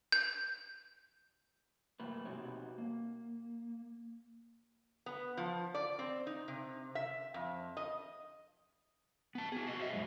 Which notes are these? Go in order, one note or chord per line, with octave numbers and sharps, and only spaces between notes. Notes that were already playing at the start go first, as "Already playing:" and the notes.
G6
F#2 C3 A3 A#3 B4
B2 C4 D#4 F#4 G4 C#5
A#3
B3
F3
D5
C4
D#4
C3
E5
F2
D#5
B3 A5
F#4 G#4
F#4 D#5
C5 D#5 E5
F#2 G#3